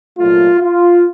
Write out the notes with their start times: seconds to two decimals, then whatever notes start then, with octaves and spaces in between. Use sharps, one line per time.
0.19 C2 A#2 F#3 A3 F4
0.61 F4